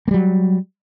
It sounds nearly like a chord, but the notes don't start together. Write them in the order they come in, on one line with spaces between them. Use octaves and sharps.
A#3 G3 F#3